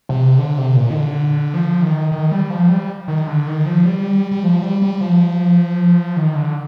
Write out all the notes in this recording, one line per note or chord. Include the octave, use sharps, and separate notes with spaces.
C3
D3
C3
A#2
D#3
D3
F3
D#3
D#3
G3
F3
G3
D#3
D3
D#3
F3
G3
G3
F3
G3
G3
F3
D#3
D3